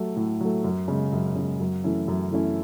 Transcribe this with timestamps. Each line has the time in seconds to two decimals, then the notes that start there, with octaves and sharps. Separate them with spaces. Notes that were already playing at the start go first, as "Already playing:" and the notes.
Already playing: F#3 A3
0.16 A2
0.41 F#3 A3
0.64 F#2
0.88 C#3 G#3
1.12 F#2
1.35 C#3 G#3
1.60 F#2
1.84 E3 A3 C#4 E4
2.08 F#2
2.31 E3 A3 C#4 E4